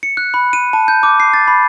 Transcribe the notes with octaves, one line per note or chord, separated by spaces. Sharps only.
C#7
F#6
B5
D#7
A5
G6
D6
C7
A6
B5